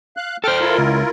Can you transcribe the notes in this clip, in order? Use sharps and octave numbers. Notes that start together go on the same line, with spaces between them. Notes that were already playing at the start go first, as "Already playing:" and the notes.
F5 F#6
A4 C5 G5 F6
E4 F4 A#4
C#2